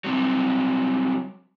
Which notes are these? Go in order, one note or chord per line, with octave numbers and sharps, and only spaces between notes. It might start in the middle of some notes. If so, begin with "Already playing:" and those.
F#3 G3 C4